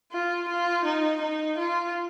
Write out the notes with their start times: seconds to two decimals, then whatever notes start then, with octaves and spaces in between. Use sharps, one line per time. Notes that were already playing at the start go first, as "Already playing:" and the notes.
0.12 F4
0.48 F4
0.85 D#4
1.21 D#4
1.58 F4